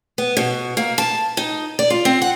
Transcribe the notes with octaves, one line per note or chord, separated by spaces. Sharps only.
B3
B2
A#3
A5
D#4
D5
F4
C4
F#5